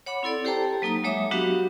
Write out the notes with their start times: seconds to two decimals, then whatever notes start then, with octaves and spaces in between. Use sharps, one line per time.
0.06 C#5 F#5 B5 D6
0.23 C4 E4 A4 D5
0.45 G4 A4 C5 G5 A5 A#5
0.82 F#3 A#3 D#4 A#5 D#6
1.04 F#3 G#3 C#5 E5 D6 D#6
1.31 F#3 B3 D4 F#4 G4 F5